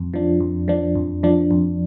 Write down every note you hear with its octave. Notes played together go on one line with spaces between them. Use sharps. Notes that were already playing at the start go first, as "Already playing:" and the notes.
Already playing: F2
F3 D4
F2
F3 D4
F2
F3 D4
F2